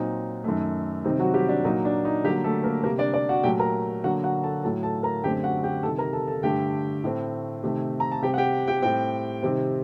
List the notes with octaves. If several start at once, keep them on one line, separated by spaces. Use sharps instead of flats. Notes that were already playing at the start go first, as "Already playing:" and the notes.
Already playing: A#2 F#3 C4 D#4
F#2 D#3 A3
C3 D#3 G3 C4 D#4
F#3 F#4
G3 G4
D4
A#2 F#3 A#3 D#4
D4
D#4
D3 F#3 G3 A#3 G4
A3 A4
A#3 A#4
C3 G3 A#3 A#4
D4 D5
D4 D5
F#4 F#5
A#2 F#3 A3 G4 G5
A#4 A#5
D3 F#3 A#3 F#4 F#5
F#4 F#5
A4 A5
A2 F#3 A3 A4 A5
A4 A5
A#4 A#5
F#2 D3 A3 C4 G4 G5
F#4 F#5
G4 G5
C3 D#3 G3 A4 A5
A#4 A#5
A4 A5
A4 A5
G2 D3 A3 G4 G5
A2 A3 C4
C3 D#3 A3 C4
A#5
A5
C3 G3 C4 G4 G5
F#5
G4 G5
G4 G5
A2 G3 C4 G4 G5
C3 D#3 G3 C4